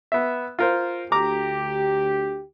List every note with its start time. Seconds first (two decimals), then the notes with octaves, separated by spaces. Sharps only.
0.12 B3 E5
0.59 F4 A#4 C5
1.12 D2 G4 A#5 D6